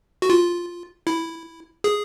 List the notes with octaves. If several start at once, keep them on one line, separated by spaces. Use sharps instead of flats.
F#4
F4
E4
G#4